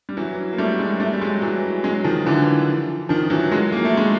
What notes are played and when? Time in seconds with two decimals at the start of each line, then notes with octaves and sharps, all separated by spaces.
0.09 G3
0.17 E3 F#3
0.53 A#3
0.58 G3 A3
0.79 F#3 G#3
1.00 G3 A3
1.13 G3
1.21 F#3 G#3
1.42 E3 F#3
1.84 F#3 G#3
2.04 D#3 F3
2.26 D3 E3
3.09 D#3 F3
3.30 E3 F#3
3.52 F#3 G#3
3.72 A#3
3.85 A3
3.97 G#3